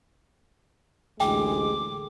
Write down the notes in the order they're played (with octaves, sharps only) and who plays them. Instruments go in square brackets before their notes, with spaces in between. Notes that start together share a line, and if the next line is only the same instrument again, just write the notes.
[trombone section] A1 D2 G#3 [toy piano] G5 [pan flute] D6